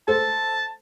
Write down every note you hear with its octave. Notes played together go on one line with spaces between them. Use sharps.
A4 C5 A5